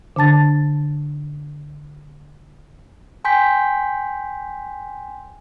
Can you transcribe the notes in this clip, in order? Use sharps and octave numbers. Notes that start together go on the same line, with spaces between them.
D3 D4 A5 A6
G5 G#5 C6 G6 B6